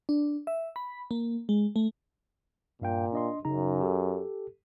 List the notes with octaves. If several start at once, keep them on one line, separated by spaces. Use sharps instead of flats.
D4
E5
B5
A#3
G#3
A3
G2 A#2 F5 G5
D4 D#5 C6
F#2 C#3 D#4 A#5
G4 A4